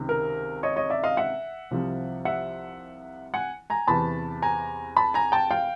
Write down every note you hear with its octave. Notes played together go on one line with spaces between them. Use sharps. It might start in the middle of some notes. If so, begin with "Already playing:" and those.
Already playing: C#2 C3 D#3
A#4
C#5 D#5
C#5 D#5
D5 E5
D#5 F5
E5 F#5
C2 C3 F3
E5 F#5
F#5 G#5
G#5 A#5
E2 C3 E3 A5 B5
G#5 A#5
A5 B5
G#5 A#5
G5 A5
F5 G5